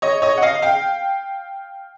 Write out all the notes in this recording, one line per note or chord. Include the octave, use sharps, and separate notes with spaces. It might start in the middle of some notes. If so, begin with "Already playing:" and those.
C#5 D#5
C#5 D#5
F#5
D#5 F5
F5 G5